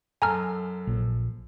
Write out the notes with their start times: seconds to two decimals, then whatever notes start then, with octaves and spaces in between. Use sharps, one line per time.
0.22 F#2 A4 G#5 A#5 F6
0.87 A#1